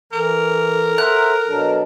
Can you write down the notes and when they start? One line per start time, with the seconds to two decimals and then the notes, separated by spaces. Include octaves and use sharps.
0.13 E3 A4 A#4
0.98 C5 E5 F#5 A#5 F#6
1.47 B2 F#3 D4